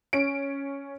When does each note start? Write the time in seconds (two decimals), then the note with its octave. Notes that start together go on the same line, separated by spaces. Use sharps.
0.13 C#4 D7